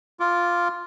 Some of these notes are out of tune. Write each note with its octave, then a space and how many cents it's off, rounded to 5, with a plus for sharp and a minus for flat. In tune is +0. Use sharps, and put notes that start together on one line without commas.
F4 +0 D6 -20